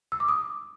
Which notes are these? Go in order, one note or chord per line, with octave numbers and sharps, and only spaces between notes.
E6
D6
D#6